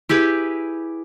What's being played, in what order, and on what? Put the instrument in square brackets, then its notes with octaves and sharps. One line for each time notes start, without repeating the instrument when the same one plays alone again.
[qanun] E4 G4 G#4 B4